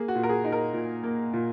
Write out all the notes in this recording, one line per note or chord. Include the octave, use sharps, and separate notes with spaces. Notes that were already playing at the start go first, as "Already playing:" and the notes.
Already playing: A#3 G#4
F#4
A#2
A#4
G#4
D#4
A#4
A#2
A#3
A#2